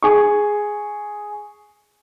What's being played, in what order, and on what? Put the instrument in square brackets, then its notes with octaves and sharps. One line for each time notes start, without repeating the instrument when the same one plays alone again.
[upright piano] G#4 C#6